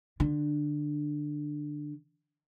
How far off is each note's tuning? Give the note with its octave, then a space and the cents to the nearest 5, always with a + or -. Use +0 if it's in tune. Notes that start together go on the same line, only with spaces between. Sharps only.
D3 +15 D4 +0